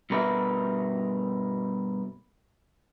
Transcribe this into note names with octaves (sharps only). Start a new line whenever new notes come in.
G2 B2 A#4 B4 E5